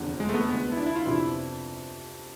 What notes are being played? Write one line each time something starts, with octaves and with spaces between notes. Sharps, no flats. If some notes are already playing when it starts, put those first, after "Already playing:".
Already playing: F1 E2 D3 F3
G#3
A3
B3
D2 D3 G#3
E4
D4
E4
F4
F2 C3 F3 B3 D4 E4